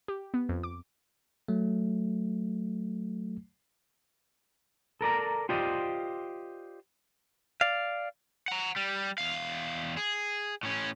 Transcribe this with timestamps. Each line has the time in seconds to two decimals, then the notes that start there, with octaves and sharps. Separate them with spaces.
0.08 G4
0.34 B3
0.49 F2
0.63 D6
1.48 F#3 A3
5.01 A4 A#4 D5 A#5
5.49 F4 G4 C5 D5 D#5
7.61 D5 F5
8.48 F#5 A#5
8.76 G3
9.18 E2 F5
9.97 G#4
10.63 A2 C#4